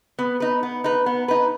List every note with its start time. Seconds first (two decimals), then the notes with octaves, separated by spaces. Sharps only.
0.19 B3
0.40 D#4 B4
0.63 B3
0.84 D#4 B4
1.06 B3
1.28 D#4 B4